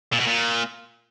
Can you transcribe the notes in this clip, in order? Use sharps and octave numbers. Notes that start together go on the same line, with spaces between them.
A#2
B2
A#2